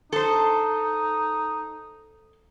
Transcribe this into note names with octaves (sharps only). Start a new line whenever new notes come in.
D#4 A4 C5